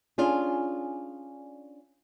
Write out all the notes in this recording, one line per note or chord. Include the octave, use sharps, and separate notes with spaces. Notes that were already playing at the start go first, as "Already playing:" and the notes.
C#4 D4 F4 G#4